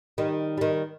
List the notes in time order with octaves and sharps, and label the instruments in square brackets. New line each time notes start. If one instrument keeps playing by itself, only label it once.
[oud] D#3 G3
D#3 G3